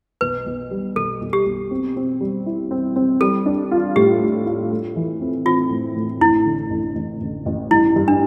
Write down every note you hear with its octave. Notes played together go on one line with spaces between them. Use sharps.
B1 B4
B1
G3
B1 A4
B1
G4
B1
C4
C4
G3
E4
C4
C4
G3 A4
D4
F4
A2 G4
F4
F4
A3
E3
C4
C4 F4
A2
A2
A1 E4
D3
A1
A1
A1
A1
G2 E4
G2
D4